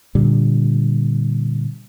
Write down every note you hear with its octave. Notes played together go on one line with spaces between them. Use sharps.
A#2 D3 G3